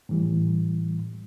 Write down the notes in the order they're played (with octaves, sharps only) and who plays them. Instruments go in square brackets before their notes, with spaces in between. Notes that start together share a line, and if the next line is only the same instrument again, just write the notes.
[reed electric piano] A2 E3 G3